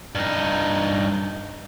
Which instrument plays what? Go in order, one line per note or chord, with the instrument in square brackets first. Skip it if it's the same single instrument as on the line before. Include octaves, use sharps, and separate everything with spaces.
[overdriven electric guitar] G2 D#4